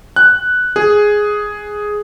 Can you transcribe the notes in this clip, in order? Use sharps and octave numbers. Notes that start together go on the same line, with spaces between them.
F#6
G#4